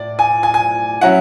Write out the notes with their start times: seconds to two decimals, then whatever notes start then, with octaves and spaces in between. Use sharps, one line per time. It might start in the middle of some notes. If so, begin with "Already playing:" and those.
Already playing: A2 D5
0.19 G#5
0.43 G#5
0.54 G#5
1.01 F#3 C#4 E4 F#5